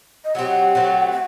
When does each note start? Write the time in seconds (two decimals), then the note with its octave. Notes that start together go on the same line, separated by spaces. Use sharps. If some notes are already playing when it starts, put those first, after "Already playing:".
0.25 D#5
0.35 F#3 A3 C4 G4 F#5
0.75 F#3 A3 C4 G4
1.12 F#5